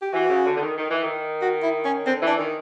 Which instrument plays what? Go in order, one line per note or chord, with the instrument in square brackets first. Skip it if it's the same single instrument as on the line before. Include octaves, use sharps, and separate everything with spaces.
[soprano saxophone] G4
[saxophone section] E3 [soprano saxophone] F#4
[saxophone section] C#3
D3
D3
D#3
D#3
E3
D#3
[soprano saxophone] F#4
E4
C#4
[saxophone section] D3 [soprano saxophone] C4
[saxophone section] E3
[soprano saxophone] D4
[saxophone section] D#3